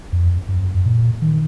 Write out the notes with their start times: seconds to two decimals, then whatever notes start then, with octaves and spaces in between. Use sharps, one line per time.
0.12 F2
0.48 F#2
0.85 A#2
1.22 D#3